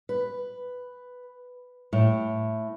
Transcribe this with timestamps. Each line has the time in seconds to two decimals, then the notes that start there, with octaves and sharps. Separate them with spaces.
0.09 B4
1.93 A2